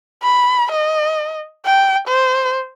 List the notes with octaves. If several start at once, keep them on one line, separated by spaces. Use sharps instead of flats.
B5
D#5
G5
C5